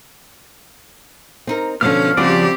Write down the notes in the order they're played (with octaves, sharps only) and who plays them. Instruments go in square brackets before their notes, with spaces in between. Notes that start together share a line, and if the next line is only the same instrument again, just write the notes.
[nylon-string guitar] C4 D#4 A#4
[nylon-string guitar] B2 D3 [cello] F3 C#4 [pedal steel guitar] F6
[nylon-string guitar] C#3 G3 F#4 [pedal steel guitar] F3 D5 [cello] C4 G4